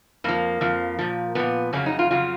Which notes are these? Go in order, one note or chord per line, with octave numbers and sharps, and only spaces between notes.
F2 F3 A#3
F2 F3
A#2 F3
A#2 F3 B3
F2 C#3 F#3 C#4
D#4
F4
F2 C#3 F#3 F4